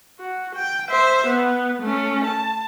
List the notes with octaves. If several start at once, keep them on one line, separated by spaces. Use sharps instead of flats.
F#4
G5
C5 E5
B3
A3 C#4
A5